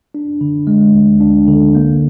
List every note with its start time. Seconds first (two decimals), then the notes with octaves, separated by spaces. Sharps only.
0.14 D4
0.41 D3
0.67 G#3
0.94 D2
1.20 D4
1.48 D3
1.75 A#3